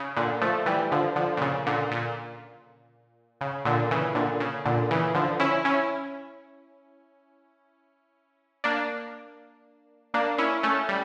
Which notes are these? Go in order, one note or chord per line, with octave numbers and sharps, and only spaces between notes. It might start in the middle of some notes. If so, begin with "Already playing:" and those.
Already playing: C#3
A#2 D3
F3 A3
E3 G3
D3 F3
D3 F3
A#2
C#3
A#2 D3
A#2
C#3
A#2 D3
C#3 E3
A#2 D3
C#3
A#2 D3
C#3 E3
D3 F3
C#4 E4
C#4 E4
A#3 D4
A#3 D4
C#4 E4
A3 C#4
G3